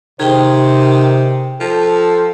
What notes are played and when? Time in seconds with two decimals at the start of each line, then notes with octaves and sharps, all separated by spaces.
0.20 C3 D#3 G#4 C5 G5
1.60 F3 A4